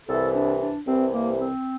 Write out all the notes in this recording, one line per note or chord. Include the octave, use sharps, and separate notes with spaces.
C2 C3 E3 A4
D4
D4
C2 C3 E3 C4
A#3
C4